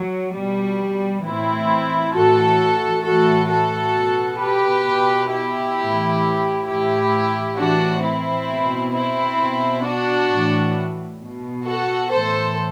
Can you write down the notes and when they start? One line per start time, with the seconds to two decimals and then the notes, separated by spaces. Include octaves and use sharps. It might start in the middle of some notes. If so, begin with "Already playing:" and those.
Already playing: F#3
0.33 B2 G3
1.23 A2 E3 C4 E4
2.14 A2 E3 F#4 A4
3.04 A2 E3 F#4 A4
3.50 F#4 A4
3.96 B2
4.41 G4 B4
4.86 B2
5.31 E4 G4
5.77 A2 E3
6.67 A2 E3 E4 G4
7.57 A2 E3 D4 F#4
8.03 C4 E4
8.48 B2
8.93 C4 E4
9.39 B2
9.84 D4 F#4
10.29 A2 E3
11.20 B2
11.65 F#4 A4
12.10 A2 E3 A4 C5